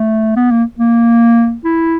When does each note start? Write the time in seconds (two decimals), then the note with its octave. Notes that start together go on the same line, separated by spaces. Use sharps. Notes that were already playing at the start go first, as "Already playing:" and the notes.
Already playing: A3
0.36 B3
0.51 A#3
0.79 A#3
1.65 E4